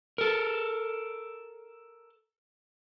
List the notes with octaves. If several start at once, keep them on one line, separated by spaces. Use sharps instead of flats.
A4 A#4